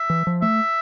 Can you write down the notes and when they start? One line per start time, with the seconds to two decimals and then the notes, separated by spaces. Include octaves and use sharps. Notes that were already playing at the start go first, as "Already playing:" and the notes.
Already playing: E5
0.10 E3
0.27 F3
0.42 A3 E5